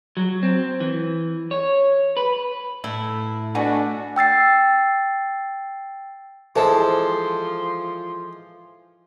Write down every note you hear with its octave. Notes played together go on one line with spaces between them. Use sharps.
F#3
C4
E3
C#5
B4
A2 E4
B2 A3 D4 F#4 F#5 G#5
G5 E6 A6 C7
E3 F3 G#3 A4 C5 A5 C6